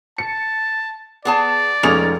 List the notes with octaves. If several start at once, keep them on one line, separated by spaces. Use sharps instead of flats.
A5 C#7
B3 G#4 D5 A5
F1 G#3 A#3 C#4 D#4 F7